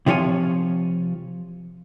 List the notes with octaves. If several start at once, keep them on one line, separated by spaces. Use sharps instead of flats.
C3 F3 F4 C#5 G#5